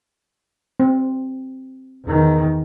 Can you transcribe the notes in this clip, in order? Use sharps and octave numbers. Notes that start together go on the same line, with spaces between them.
C4
E2 D#3